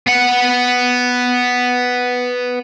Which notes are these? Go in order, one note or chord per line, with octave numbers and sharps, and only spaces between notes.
B3 F#5